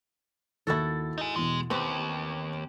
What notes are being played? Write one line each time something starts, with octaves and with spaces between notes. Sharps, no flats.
D#2 E4 F#4 A4 A6
D#4 G#4
E2 B2 G#3
D#2 B3 C4 G4 C#6